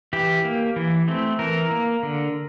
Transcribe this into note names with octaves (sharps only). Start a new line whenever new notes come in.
E3 G4
A#3
E3
A3 C4
E3 A#4
A#3
D3